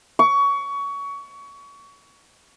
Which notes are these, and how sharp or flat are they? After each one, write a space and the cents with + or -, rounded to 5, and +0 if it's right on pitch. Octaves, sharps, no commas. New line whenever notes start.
C#6 +25